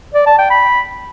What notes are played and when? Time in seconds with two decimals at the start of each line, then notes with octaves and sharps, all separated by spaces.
0.15 D5
0.27 A5
0.39 G5
0.51 B5